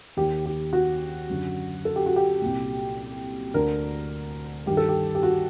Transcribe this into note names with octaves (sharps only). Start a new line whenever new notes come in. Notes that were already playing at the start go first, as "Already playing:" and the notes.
D#2 D#3 G4
G4
F#4
F#2 D3
A4
G4
F#4
G4
C2 A#2
D2 D3 A#4
G2 D#3 G4
A4
G4
G4
F#4